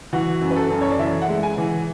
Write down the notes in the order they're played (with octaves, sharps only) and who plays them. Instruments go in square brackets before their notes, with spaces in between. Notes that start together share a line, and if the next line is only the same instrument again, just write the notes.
[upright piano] E3 F#4
F#2
B4
A4
F#2
C#5
D5
E3 E5
F#5
G#3
G#5
E3